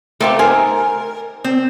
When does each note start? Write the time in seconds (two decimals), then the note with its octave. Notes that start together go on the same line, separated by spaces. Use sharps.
0.21 A3 A#3 C4 G4
0.39 D#3 A#4 C5 G#5
1.44 C4